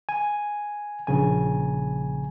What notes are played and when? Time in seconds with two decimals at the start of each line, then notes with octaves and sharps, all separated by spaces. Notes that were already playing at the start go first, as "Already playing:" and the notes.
0.09 G#5
1.07 A#1 C#3 G#5